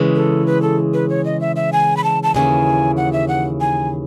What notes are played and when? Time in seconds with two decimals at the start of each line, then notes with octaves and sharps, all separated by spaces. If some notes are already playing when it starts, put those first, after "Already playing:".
Already playing: C#3 E3 G#3
0.15 A4
0.46 B4
0.62 A4
0.94 B4
1.10 C#5
1.25 D#5
1.41 E5
1.56 E5
1.73 G#5
1.97 B5
2.04 A5
2.23 A5
2.35 D#2 C#3 E3 G#5
2.97 F#5
3.13 E5
3.28 F#5
3.60 G#5